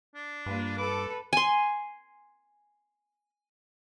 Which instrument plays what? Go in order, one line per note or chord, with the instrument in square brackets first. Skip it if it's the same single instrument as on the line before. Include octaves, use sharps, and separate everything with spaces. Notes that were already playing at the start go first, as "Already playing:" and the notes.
[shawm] D4
[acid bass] G2 [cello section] A#3 F4 B4
[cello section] A4 [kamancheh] B4 [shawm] D6
[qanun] G#5 C6